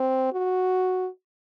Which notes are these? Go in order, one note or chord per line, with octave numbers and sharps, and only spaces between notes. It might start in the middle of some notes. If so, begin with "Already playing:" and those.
Already playing: C4
F#4